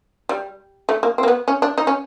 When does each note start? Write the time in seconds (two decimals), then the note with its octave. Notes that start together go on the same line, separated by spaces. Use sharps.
0.29 G3
0.89 A3
1.03 A#3
1.18 C4
1.23 A#3
1.28 B3
1.48 C#4
1.62 D4
1.78 D#4
1.87 C#4